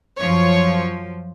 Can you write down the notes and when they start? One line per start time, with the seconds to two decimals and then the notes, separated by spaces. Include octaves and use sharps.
0.20 F#2 F3 C#5